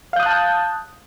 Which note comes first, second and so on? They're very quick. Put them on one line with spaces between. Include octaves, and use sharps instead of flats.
F5 G6 D#6 F#6 A5